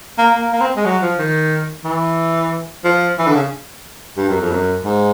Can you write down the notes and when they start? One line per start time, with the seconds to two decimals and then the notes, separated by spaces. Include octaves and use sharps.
0.18 A#3
0.35 A#3
0.52 A#3
0.61 C4
0.76 G#3
0.85 F#3
1.02 F3
1.18 D#3
1.84 E3
2.84 F3
3.19 E3
3.27 D3
3.35 C#3
4.17 G2
4.29 F#2
4.41 F2
4.51 F#2
4.85 G#2